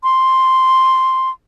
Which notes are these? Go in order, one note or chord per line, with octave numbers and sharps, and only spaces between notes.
C6